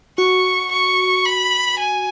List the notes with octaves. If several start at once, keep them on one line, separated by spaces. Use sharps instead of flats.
F#4 C#6
C#6
B5
G#5